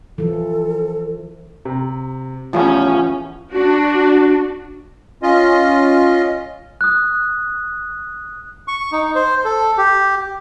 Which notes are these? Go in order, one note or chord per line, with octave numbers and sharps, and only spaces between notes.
E3 F3 A4
C3 A#5
A1 E2 C#3 E3 F3 C#4 F#5
D4 F#4
C#4 F4 D#5
D#6 F#6
C#6
D#4
C5
A4
G4